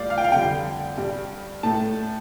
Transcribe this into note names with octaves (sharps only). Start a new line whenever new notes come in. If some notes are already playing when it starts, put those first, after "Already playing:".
Already playing: A2 G3 D5 F5
F5
G5
F5
F2 D3 G3 G5
G2 G3
A2 A3 A5